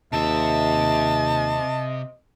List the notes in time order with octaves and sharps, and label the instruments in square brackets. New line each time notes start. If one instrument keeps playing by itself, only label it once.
[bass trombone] D#2 [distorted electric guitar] C3 E5 [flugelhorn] D#5 [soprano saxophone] A5